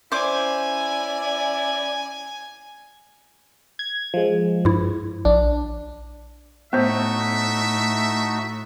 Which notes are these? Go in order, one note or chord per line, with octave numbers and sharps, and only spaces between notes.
C#4 E4 C5 D5 G#5 D6
G#6
F3 G#3
G2 E4
A#1 D4
A2 A3 B3 D#4 F#4 C5 E5